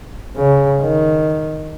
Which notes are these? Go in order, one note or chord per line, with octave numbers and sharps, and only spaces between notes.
C#3
D#3